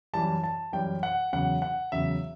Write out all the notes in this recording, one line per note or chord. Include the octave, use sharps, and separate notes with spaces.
F#2 E3 G3 A5
A5
F#2 E3 G3 G5
F#5
E2 C#3 F#3 F#5
F#5
E2 C#3 F#3 E5